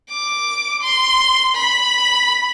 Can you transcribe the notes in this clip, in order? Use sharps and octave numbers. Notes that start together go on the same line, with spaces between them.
D6
C6
B5